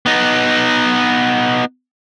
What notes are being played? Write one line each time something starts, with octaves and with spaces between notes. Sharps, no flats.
B3 D#4